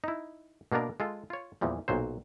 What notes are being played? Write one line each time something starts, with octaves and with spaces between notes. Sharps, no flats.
D#4 E4
B2 A#3 B3 D4 A#4
G#3 F4 A4
F4 C#5
E2 A#2 E3 F3 G3
B1 A#2 F#3 C5